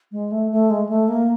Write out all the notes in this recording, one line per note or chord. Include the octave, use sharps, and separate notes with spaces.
G#3
A3
A3
G#3
A3
A#3